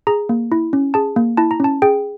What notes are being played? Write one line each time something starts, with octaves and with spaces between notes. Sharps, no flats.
G#4 A#5
A#3
E4
C#4
G#4 A5
A#3
E4 A5
A#5
C#4 A5
G#4 G5